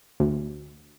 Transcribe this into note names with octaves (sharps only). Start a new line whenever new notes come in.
D2